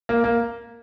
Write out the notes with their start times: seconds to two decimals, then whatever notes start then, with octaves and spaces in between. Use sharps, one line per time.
0.09 A#3
0.24 A#3